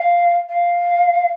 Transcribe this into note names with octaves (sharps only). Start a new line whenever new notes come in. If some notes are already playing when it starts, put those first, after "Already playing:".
Already playing: F5
F5